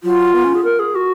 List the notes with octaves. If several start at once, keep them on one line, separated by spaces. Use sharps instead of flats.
F#3 F4
B3
C#4
G#4
A#4
G#4
F#4